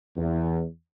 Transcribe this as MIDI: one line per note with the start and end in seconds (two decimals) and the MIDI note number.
0.17 0.65 40